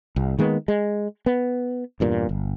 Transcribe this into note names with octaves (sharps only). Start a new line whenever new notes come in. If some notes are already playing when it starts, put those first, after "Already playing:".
C2
D#3 G#3 A#3 B3
G#3
B3
E2 G2 A#2
G1